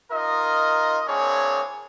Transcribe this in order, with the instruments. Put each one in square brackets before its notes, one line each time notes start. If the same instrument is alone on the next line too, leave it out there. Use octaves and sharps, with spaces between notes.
[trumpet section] D#4 F4 A#4 D#5
A#3 C4 D4 E4 G#4 C#5